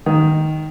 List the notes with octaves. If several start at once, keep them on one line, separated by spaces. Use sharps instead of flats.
D#3